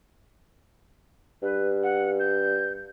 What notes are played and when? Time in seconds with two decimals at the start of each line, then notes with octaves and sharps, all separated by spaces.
1.43 G2 B4
1.83 F#5
2.19 G6